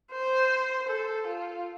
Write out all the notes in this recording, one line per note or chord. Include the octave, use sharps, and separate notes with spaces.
C5
A4
F4